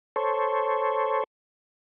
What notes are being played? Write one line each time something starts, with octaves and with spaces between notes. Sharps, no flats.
A4 C5 C#5